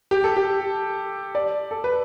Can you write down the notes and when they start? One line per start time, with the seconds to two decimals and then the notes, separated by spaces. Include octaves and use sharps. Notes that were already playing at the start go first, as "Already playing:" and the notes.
0.11 G4
0.24 A4
0.37 G4
1.35 D5
1.71 A4
1.84 B4